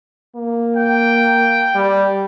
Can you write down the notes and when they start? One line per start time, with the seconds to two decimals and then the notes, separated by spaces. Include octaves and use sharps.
0.36 A#3
0.76 G5
1.75 G3